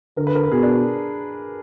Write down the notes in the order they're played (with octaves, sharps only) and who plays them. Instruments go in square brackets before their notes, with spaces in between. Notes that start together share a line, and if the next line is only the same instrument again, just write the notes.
[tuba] D3 [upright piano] A#4
[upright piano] B4
A#4
B4
[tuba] B2 [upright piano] G#4
[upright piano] D4